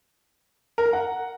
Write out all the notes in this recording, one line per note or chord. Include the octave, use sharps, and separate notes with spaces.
A#4
A#5
F#5